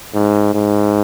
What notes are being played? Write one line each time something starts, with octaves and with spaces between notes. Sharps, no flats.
G#2
G#2